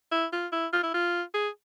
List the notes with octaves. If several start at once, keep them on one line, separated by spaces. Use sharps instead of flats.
E4
F4
E4
F4
E4
F4
G#4